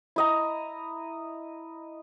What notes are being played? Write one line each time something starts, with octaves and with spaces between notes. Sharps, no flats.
E4 D#5 A#5